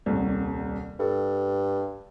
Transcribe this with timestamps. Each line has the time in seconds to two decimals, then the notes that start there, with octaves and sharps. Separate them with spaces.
0.06 D#1 C2
1.00 G2 A4